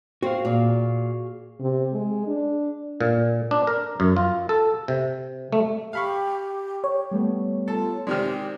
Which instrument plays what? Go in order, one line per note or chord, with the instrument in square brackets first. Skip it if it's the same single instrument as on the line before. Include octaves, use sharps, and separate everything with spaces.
[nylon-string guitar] C4 [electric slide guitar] F#4 G#4 F5
[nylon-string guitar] A#2
[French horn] C3
G#3
D4
[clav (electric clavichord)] A#2
D4
A#4
F#2
F4
A4
C3
A3
[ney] G4 [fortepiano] F5 B5 C#6
[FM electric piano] C#5
[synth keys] G3 A3 B3
[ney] F4 [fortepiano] A4
[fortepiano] C3 D#3 G#3 [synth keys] C4 D5 [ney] G4